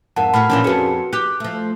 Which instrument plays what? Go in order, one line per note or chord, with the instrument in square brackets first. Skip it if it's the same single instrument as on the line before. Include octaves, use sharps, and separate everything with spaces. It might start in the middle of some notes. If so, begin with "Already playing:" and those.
[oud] F2 G#2 [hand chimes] A#4 F#5 A5
[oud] A2 F#4 [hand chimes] B5 F6
[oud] A#2 E3 F3 [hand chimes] C#4 D4 A#4
[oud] F2 G#4 [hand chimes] F#4 B4 C#7
[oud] G4 [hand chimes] F#6
[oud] F3 A3